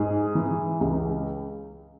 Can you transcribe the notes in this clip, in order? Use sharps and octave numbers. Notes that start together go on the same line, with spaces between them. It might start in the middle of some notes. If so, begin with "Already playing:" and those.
Already playing: G#2 G#4
E3
C#2